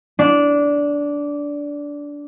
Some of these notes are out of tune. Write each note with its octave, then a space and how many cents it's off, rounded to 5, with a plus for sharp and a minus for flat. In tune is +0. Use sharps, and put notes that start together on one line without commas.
D4 -15